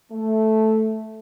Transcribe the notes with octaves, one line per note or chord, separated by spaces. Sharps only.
A3